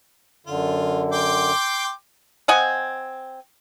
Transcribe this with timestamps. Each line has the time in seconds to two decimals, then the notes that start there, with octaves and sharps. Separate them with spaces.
0.47 F#2 D3 F4
1.12 G5 C6 D6
2.48 C4 D#5 F#5 G#5